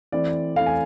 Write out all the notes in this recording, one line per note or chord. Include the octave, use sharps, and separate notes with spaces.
E3 A3 C4 E4 D5
E3 A3 C4 E4 F5
G#5